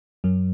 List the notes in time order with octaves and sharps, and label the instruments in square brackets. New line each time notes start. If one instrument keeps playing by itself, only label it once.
[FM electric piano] F#2 F#3